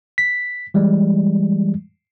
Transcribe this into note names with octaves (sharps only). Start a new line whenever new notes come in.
B6
E3 G3 G#3